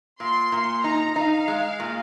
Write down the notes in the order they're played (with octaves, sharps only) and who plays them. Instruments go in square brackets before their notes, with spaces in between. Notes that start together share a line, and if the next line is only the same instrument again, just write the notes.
[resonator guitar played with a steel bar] A#2 [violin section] C6
[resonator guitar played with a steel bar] A#2
[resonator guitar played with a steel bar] D#4 [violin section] A#5
[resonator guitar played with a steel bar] D#4 [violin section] F5
[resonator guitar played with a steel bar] G#3
A#2